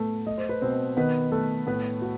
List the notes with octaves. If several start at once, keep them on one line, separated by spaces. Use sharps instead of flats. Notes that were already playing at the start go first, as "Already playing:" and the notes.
Already playing: A2 A3 B3 B4
A3 D#5
C5
B4
B2 C4 C5
D#3 B3 B4
A3 A4
A2 B3 B4
F#4